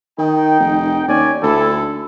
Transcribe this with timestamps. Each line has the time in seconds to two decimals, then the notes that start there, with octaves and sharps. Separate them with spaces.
0.18 D#3 D#4 G5
0.59 F1
1.07 D#2 C#4 D5 G#5
1.43 D2 E4 A4